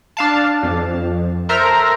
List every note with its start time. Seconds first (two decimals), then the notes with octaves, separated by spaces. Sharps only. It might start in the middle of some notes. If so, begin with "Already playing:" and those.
0.17 D4 F5 A5
0.63 F2
1.49 A4 A#4 C5 E5 A#5 F6